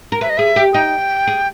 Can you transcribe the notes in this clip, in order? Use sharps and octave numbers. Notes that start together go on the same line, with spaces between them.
A#4
B4 E5
D#5
G#4 E5
G4
D#4 G5
G#4